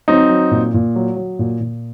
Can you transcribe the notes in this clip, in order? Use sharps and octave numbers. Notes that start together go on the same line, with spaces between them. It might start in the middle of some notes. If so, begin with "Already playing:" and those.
F#3 C4 D#4
F#3
A#2
A#2
F#3
F#3
A#2
A#2